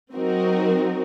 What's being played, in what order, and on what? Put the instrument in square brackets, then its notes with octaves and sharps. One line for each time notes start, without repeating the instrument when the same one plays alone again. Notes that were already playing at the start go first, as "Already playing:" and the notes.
[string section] F#3 C4 D#4 F#4 A#4